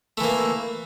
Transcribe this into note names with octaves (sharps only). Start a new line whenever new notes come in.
E3 A3 A#3